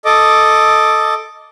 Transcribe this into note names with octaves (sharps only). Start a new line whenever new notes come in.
A4 D#5 D6